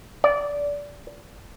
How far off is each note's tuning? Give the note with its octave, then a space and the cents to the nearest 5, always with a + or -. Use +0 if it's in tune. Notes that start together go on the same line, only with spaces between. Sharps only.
D5 -15